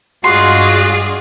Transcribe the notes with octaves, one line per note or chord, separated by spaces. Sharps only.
G2 G#3 F4 F#4 G#4 D5 C6